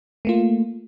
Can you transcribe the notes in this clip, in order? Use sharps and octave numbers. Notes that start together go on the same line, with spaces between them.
A3 A#3 F4